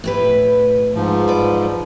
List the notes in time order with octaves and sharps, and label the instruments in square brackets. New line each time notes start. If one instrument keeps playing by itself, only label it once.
[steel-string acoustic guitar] A2 G4 B4
[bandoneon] G#2 F3
[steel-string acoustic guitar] B4 D5